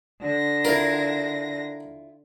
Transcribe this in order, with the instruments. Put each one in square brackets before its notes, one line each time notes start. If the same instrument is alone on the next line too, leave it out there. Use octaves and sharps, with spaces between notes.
[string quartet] D3 A#6
[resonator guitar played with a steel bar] E4 F4 [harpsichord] A#4